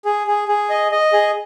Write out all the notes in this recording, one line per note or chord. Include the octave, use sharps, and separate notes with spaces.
G#4
G#4
G#4
D#5
D#5
G#4